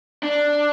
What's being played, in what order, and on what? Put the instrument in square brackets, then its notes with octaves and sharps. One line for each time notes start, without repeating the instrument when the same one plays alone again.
[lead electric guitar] D4